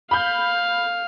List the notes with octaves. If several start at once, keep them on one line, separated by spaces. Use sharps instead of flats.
F5 B5 G6